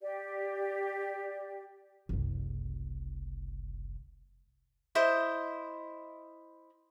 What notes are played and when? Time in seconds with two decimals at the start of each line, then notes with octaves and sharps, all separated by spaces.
0.01 G4 D5
2.09 F#1 C2
4.95 E4 C5 D#5